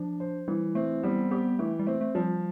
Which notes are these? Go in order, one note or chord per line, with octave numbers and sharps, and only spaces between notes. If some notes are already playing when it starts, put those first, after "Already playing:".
Already playing: F3 D4
C5
E3 G3
A3 C4
G3 B3
B3 G4
E3 A3
G3
A3 C4
A3
F3 G3